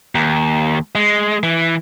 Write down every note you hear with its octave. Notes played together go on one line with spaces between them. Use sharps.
D#2
G#3
E3